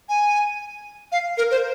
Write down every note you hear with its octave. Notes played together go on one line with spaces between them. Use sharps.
G#5
F5
A#4
C5